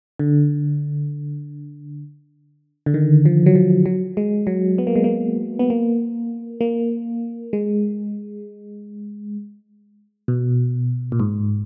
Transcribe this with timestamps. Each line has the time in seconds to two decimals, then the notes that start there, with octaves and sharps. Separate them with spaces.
0.19 D3
2.86 D3
2.94 D#3
3.25 F3
3.46 F#3
3.55 F3
3.86 F#3
4.17 G#3
4.47 F#3
4.78 B3
4.87 A#3
4.96 G#3
5.04 A#3
5.59 B3
5.70 A#3
6.61 A#3
7.53 G#3
10.28 B2
11.12 A#2
11.20 G#2